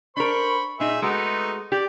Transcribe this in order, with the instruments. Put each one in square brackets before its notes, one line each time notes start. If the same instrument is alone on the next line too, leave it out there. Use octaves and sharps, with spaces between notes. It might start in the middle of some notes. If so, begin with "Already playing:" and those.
[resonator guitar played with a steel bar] D4 A#4 [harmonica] C5 B5 C#6
[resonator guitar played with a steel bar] A#2 D#4 [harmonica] G#4 E5
[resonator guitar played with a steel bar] G#3 F#4 [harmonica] A3 B3 D#4
[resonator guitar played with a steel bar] G4 [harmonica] D5